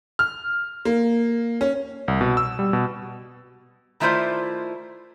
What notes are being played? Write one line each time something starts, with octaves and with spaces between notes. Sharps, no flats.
F6
A#3
C#4
C2
B2
E6
G3
B2
D#3 A3 E4 F4 C5 D5